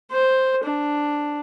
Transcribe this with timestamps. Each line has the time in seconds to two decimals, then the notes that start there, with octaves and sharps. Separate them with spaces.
0.12 C5
0.64 D4